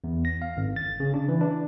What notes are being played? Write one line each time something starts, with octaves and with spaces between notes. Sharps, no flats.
E2
A#6
F5
G#1
A6
C#3
D4
E3
D4